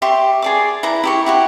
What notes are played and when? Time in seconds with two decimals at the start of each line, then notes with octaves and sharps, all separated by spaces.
0.02 G4 E5 C6 C#6
0.42 G#4 D5 D6
0.83 E4 B4 A#5
1.04 E4 G4 C#6
1.26 E4 F#4 G4